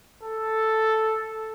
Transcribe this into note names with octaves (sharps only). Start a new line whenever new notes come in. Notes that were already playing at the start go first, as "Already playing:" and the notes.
A4